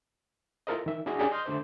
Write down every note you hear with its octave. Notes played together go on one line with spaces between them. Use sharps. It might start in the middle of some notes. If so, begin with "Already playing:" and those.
E4 F4 A4 A#4 C5 D#5
D#3 E5
D4 E4 F#4 G#4 D#5 A#5
C#4 D4 G4 G#4
D#5 C6 D#6 F6 G6
D3 A3 D4 A4 C5 D5